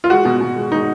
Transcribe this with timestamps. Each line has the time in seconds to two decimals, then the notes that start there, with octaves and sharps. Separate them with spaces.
0.04 F4
0.10 G#3 F#4
0.25 B2
0.41 B2
0.56 G#3
0.72 G#3 D#4